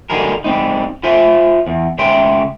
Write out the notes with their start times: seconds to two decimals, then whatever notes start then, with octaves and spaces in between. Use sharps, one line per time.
0.10 D3 F#3 G3 D#4 G#4 A#4
0.44 G3 C4 D#4
1.03 F4 C5 E5 G#5
1.67 E2
1.99 C#3 G#3 E5 G5 C6